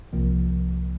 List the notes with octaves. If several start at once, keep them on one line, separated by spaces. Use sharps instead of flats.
C2 C3 F3 A#3